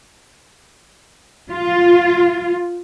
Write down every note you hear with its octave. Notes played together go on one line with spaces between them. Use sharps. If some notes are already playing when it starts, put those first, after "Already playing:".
F4